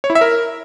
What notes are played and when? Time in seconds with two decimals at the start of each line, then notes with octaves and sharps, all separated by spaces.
0.04 C#5
0.10 E4
0.15 E5
0.21 A#4